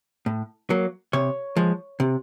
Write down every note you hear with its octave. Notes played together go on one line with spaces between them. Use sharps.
A2
F#3 A#3
C3 C#5
F3 G#3
C3